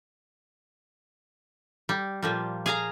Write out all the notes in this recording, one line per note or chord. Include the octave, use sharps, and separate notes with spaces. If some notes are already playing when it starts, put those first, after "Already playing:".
G3
A#2 F3 G3
G#4 F5 A#5